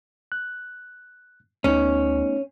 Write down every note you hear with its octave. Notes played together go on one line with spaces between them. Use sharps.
F#6
D2 A3 B3 C#4 D#4